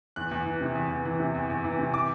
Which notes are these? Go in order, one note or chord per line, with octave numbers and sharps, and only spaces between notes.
E2 F#6
E2
E3
C3
E2
E2
E3
C3
E2
E2
E3
C3
E3 D6